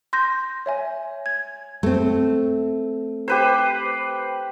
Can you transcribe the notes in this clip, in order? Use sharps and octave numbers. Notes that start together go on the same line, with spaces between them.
C6 G6 A#6
C#5 E5 G#5
G#6
A3 C4
G4 B4 C5